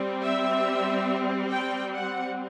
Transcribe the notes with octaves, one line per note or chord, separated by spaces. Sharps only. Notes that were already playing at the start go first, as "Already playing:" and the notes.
Already playing: G3 C4
E5
G5
F#5